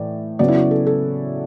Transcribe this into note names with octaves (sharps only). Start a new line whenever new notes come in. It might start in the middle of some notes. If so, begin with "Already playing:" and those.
Already playing: A2 E3 D5
C#3 F#3 B3 D5
E4
F#4
A4
A4